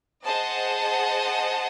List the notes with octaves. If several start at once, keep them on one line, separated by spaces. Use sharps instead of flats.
G#4 C5 D#5 F#5 A5